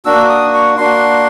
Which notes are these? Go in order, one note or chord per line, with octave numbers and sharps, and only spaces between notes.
A#3 D4 F#4 E6
D#6
C#6
A#3 D4 F#4 C6